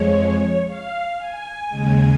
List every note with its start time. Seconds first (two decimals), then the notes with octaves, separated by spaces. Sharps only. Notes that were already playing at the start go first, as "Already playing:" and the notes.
Already playing: F2 F3 G#3 C#5
0.67 F5
1.18 G#5
1.69 D#2 C#3 G#3